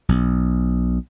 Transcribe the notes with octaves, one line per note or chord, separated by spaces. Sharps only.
B1